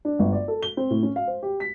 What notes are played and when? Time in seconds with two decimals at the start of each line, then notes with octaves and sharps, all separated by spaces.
0.05 D4
0.19 G1
0.32 D5
0.48 A4
0.63 G7
0.77 C4
0.90 A2
1.03 C#4
1.16 F5
1.27 C5
1.43 G4
1.60 B6